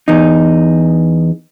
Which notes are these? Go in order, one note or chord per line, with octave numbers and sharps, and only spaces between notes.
E2 D#4